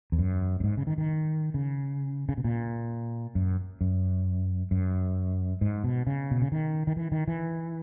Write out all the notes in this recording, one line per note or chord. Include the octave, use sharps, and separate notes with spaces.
E2
F#2
F#2
G#2
C#3
D#3
D#3
C#3
C#3
B2
A#2
F#2
F#2
F#2
G#2
B2
C#3
B2
C#3
D#3
D#3
E3
D#3
E3